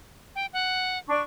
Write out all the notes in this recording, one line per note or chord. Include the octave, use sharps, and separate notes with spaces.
G5
F#5
D4 C#6